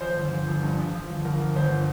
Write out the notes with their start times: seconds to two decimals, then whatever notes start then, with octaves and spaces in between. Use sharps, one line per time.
0.01 F3 C5
0.17 G1
0.33 F3
0.47 G1
0.63 G2
0.79 F3
0.95 F3
1.10 G1
1.25 G1 A#4
1.40 F3
1.56 G1 C5